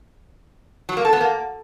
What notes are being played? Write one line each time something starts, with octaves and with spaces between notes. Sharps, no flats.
F#3
A#3
A4
B3
A#3